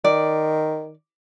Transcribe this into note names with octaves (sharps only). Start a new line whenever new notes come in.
D#3 D5